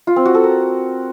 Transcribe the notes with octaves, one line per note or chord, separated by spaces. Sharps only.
F4
C4
F#4
A4
A#4